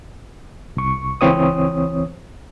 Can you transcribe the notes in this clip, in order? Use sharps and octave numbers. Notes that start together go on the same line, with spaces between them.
C2 C#6
C#2 E3 C4 C#5 D#6